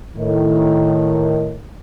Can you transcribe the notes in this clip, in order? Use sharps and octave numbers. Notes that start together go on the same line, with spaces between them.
A2 D#3